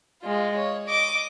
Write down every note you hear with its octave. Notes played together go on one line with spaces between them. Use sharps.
G#3 F4
C#5
D#5 D6